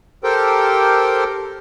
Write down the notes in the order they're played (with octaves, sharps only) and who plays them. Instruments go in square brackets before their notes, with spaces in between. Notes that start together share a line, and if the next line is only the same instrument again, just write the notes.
[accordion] G4 A4 A#4 C5 G5